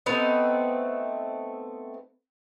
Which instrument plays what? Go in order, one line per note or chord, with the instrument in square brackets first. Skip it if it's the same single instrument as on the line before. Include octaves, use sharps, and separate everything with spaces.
[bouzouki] A3 B3 C4 D#4